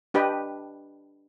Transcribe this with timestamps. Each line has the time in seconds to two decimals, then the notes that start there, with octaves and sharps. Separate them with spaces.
0.14 D4 G4 B4 D#5 G5